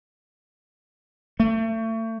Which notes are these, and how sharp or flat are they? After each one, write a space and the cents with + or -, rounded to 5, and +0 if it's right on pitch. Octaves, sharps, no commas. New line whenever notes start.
A3 +35